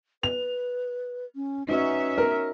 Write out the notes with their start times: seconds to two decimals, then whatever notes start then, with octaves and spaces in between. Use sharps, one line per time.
0.23 B4 F7
1.36 C#4
1.69 C#4 D#4 F#4 B4 E5
2.18 A#4